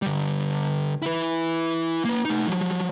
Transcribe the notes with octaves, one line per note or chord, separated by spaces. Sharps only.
D3 G3
E4 B4
A#3 B4
A3 D#4
F3 F#3